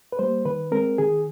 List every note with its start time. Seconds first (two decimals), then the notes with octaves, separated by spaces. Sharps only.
0.12 B4
0.19 G3 A#3 C5
0.45 D#3 B4
0.72 G#3 C4 A#4
0.98 D#3 G#4